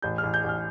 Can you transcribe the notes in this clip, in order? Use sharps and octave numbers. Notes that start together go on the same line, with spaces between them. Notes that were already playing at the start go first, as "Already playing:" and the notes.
A1 G6
F6
A1
G6
A1 F6